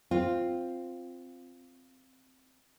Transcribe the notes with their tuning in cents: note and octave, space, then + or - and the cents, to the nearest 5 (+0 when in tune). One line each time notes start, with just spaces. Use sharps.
C4 +0 F4 +0